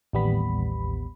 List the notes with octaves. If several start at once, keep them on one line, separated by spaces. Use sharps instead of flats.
A1 D#2 G3 B3 B5